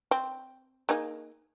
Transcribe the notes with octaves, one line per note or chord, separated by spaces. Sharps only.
C4
A#3 D#4 G#4